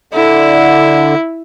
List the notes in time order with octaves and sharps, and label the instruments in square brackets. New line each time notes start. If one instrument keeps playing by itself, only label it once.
[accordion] D3 [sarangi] E4